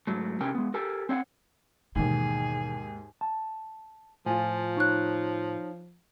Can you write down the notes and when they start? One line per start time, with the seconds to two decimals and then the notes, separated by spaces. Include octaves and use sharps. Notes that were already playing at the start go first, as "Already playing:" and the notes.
0.07 G#2 F#3 A3
0.41 C3 C#4 G4 A#4 G5 G#5
0.55 G#3 B3
0.74 G4 A4 A#4 G#5
1.09 C4 C#5 F5 F#5
1.96 D#2 G#2 B2 E3 G#4
3.21 A5
4.26 A2 F3 F4 G#5
4.77 D#4 C#5 C#6 F#6